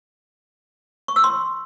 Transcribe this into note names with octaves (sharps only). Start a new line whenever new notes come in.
C#6
E6
C6